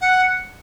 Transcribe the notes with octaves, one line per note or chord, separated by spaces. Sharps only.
F#5